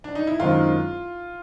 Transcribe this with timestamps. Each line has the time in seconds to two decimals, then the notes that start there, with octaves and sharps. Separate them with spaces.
0.04 D4
0.15 D#4
0.27 E4
0.39 F#2 D#3 G#3 C4 D#4 F4